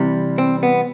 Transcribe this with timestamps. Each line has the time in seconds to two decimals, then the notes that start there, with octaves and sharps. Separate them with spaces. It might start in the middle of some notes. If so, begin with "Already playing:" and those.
Already playing: C3 E3 G3
0.38 C4
0.63 B3